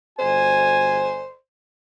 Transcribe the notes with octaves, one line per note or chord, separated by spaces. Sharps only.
G1 F#4 C5 G#5